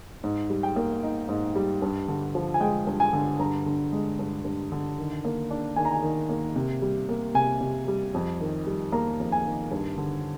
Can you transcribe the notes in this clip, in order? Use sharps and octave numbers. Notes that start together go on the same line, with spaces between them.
G#2
G3
G5
A#3
D#4
G#2
G3
G2
D3
F3
G#5
G#3 G5
G2
G#5
D3
G2 A#5
D3
G#3
G2
G2
D3
D#3
A#3
D4
D#3 G#5
A#5
G#5
D#3
A#3
C3
G3
A#3
C3 G#5
C3
G3
F2
D#3
G3
A#3 A#5
F2
G#5
D#3
G2
D3